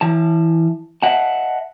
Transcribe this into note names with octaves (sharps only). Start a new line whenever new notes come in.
E3 A5
D#5 E5 F#5 A5